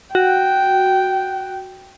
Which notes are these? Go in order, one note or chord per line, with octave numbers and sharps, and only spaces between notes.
F#4 G5